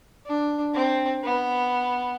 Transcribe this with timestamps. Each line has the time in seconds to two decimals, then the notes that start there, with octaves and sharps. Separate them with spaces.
0.26 D4
0.74 C4
1.23 B3